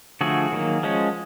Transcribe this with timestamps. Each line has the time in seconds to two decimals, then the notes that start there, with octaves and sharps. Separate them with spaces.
0.21 D3 F3 A3 F#4 G#4
0.52 D#3 F#3 A#3
0.83 F3 G#3 C#4